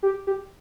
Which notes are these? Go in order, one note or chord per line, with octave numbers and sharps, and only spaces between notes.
G4
G4